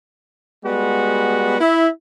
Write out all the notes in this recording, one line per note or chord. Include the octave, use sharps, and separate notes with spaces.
G3 G#3 B3 F#4
E4